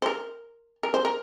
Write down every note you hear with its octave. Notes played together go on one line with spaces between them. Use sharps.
C5
A#4
A#4
C5
A#4